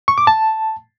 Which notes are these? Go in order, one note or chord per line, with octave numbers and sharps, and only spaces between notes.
C#6
D6
A5